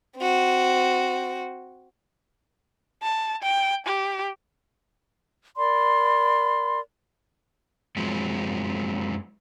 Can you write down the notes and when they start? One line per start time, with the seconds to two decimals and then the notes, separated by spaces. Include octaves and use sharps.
0.17 C4 F#4
3.03 A5
3.43 G5
3.86 G4
5.56 A#4 D5 B5 C6
7.96 F#2 F3 F#3 G#3 C4